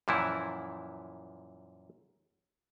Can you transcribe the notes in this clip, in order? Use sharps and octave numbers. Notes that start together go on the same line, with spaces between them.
F#2 A#2 E3 F3 E4